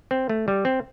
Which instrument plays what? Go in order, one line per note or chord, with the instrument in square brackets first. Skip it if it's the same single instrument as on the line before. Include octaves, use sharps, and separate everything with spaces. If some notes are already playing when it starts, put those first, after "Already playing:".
[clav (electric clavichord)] C4
A3
G3
C4